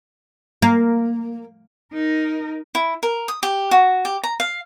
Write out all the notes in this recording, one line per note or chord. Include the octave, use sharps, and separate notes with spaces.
A#3
D#4 A#4
E4
A#4
D#6
G4
F#4
G4
A#5
F5